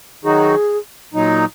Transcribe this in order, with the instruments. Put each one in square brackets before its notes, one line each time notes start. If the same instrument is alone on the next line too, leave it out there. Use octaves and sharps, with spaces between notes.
[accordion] D#3 F#3 D#4 F#4 [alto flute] G#4
[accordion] A#2 F#3 D#4